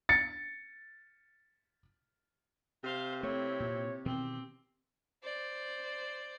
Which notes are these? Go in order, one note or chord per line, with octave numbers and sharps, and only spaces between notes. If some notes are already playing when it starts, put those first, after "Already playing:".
A6 C#7
C3 C5 F5
A3 C4 E4 C#5
A#2
B2 D#3 E3 C4 G4
C5 D5